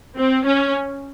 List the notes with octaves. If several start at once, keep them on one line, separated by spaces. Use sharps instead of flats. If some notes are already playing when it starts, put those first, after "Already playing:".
C4
C#4